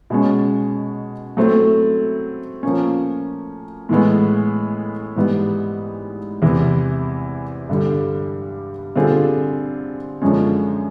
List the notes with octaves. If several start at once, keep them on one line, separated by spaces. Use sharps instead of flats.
B2 G#3 C#4
F#3 A3 C4 E4
F3 A#3 C#4
A2 E3 G#3 B3
G#2 E3 G3 B3
E2 C3 E3
G2 D3 G3
D3 G3 C4 F4 G#4
F#2 D3 F3 G#3 C#4